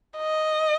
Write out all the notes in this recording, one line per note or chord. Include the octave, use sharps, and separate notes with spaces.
D#5